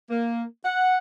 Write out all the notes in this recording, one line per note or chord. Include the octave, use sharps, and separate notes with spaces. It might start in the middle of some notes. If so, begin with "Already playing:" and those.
A#3
F#5